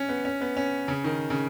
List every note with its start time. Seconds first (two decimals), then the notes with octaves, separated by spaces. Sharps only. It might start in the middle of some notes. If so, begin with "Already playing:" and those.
Already playing: C#4
0.09 B3
0.25 C#4
0.41 B3
0.57 C#4
0.88 C#3
1.04 D#3
1.30 C#3